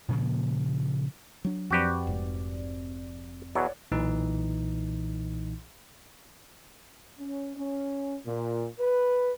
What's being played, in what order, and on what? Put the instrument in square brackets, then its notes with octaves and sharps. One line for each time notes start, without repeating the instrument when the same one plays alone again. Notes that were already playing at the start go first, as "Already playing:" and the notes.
[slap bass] A#2 C#3 F3 A#3
[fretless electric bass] F#3 D4
[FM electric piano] F2 C4 D5 [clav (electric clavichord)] F#4 G4 B4
[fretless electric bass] F1 G#2
[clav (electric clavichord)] E2 B2 F#3 [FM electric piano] C#5 D5 F#5
[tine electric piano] B1 A#2 E3 D#4
[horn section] C#4
C#4
A#2
B4